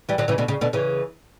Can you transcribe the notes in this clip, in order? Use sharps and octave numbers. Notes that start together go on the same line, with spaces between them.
E3 G3
D3 F#3
C#3 E3
B2 D3
C#3
B2 D3
C#3 E3